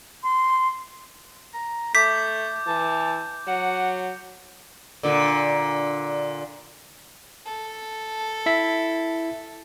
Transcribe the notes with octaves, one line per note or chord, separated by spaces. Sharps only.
C6
A#5
A3 D6 G6 B6
E3 A5
F#3 F#5
A#2 D3
A4
E4 E5 B6